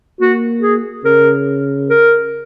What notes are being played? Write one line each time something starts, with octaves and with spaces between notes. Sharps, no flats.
A#3 F#4
G#4
C#3 A#4
A#4